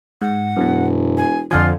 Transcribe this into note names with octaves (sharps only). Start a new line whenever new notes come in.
G#2 F#5
E1 F#2 B2
G#5
F2 D3 F3 F4 G#5